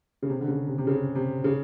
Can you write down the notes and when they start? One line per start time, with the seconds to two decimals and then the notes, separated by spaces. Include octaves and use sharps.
0.23 C#3
0.30 C3
0.41 D3
0.48 C#3
0.67 C3
0.78 C3
0.87 C#3
1.15 C3
1.44 C#3